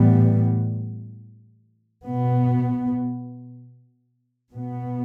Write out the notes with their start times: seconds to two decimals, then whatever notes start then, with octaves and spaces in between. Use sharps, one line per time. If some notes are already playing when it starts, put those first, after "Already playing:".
Already playing: A2 E3 G3 B3
2.03 B2 B3
4.50 B2 B3